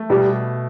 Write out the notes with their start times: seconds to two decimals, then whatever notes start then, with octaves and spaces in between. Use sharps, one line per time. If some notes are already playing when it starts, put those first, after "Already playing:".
Already playing: A3
0.10 B2 G3